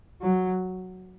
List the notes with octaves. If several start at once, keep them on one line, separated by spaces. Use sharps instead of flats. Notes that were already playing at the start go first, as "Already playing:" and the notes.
F#3